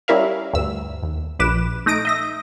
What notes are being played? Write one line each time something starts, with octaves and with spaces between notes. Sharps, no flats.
G3 C#4 E4 A#4 E5 F5
D2 G2 E6
D#2
A#1 B4 D6 E7
A3 D#4 D#6 A#6 D7
D#5 E5 A#6